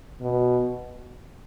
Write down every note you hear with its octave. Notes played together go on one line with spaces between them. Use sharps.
B2